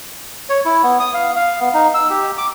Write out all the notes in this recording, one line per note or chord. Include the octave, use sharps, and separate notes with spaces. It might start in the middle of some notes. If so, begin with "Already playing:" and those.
C#5
E4
B3
D#6
F5
F5
B3
D#4
E6
G4
D6